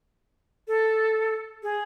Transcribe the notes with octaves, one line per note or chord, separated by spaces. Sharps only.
A4
G#4